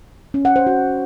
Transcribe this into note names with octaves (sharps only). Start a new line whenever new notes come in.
C#4
F#5
C5
F#4